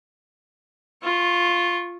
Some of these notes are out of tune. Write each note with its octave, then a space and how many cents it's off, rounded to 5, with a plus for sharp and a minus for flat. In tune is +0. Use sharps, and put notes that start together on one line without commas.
F4 +0 C#6 -25